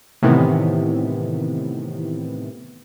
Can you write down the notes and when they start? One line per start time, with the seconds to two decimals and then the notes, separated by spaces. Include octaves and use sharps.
0.22 A2 C3 D#3 E3 B3